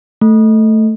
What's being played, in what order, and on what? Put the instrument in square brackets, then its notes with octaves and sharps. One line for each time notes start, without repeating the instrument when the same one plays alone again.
[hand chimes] A3